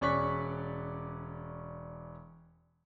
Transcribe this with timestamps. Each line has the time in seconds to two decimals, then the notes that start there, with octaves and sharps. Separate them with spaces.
0.01 E1 C#4 D5 C#6 F#6 B6